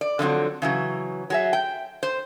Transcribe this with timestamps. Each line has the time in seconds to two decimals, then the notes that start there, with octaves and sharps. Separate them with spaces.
0.01 D5
0.19 D3 F3 F#3 C4
0.62 C#3 E3 F#3
1.30 F#3 G#4 E5
1.53 G5
2.03 C5